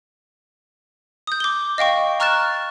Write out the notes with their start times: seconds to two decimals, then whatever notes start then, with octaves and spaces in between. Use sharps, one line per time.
1.27 D#6 G6
1.40 D6 G7
1.78 D#5 F5 G5 C#6
2.20 A#5 C#6 F6 F#6 A6 E7